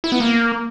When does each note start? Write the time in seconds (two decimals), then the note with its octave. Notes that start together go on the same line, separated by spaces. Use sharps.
0.04 E4
0.12 B3
0.20 A#3